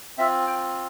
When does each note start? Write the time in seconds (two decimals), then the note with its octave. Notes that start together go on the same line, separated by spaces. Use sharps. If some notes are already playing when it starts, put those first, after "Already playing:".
0.18 C4 F4 E5
0.47 G5